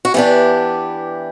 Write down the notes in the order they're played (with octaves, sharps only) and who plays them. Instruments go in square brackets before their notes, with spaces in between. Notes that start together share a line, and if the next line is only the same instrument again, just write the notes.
[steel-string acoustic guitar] F#4
E3 B3 D4 G4